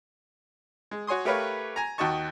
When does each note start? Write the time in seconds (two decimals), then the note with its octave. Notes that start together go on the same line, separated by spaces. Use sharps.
0.91 G#3
1.07 F#4 C#5 G#5 C6 D#6
1.25 A3 G4 A#4 B4 C#5 F5
1.76 G#5 A#5
1.98 D#2 F#4 D#5 A5 C#6